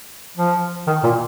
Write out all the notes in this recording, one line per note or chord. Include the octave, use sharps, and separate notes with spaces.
F3
D#3
A#2